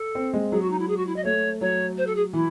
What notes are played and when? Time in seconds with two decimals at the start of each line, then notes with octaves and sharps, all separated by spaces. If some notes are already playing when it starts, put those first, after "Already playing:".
Already playing: A4
0.15 C4
0.33 G#3
0.52 F#3 G#4
0.61 F#4
0.70 D#4
0.79 E4
0.88 G#4
0.97 F#4
1.07 E4
1.16 D#5
1.24 A3 C#5
1.61 F#3 C#5
1.97 C5
2.07 A4
2.16 G#4
2.33 E3 E4